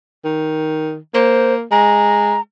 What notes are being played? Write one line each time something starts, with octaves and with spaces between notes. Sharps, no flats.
D#3
A#3 C5
G#3 A#5